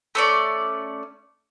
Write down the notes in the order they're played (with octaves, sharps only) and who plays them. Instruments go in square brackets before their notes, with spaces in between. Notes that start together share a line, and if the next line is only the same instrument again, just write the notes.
[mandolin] A3 C#4 D5